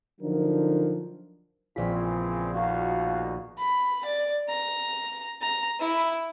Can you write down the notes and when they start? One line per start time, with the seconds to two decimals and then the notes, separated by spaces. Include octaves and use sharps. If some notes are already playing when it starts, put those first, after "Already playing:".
0.21 D3 F3 F#3 D4 D#4 A#4
1.76 A#1 C#3 E3 C4 F4 G#4 D5 B6
2.53 D#2 B2 F#4 F5
3.58 B5
4.05 D5
4.48 A#5
5.41 A#5
5.80 E4